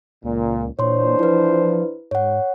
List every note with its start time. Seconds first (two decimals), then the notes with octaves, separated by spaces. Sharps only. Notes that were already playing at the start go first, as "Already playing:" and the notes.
0.23 C#2 A#2
0.79 A#2 E3 D4 C5 C#5 C6
1.19 F3 E4 B4
2.11 G#2 C#5 F#5